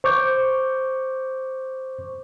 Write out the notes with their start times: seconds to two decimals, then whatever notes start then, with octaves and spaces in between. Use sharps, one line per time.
0.04 C5 C#6 D6 G6